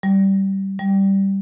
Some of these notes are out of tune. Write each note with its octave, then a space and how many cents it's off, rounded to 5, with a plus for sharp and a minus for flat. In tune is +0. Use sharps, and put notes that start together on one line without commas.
G3 -15
G3 -5